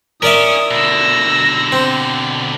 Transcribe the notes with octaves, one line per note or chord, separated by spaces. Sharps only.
C#4 A#4 D5 E5 D#6
B2 D3 E6 A#6
C4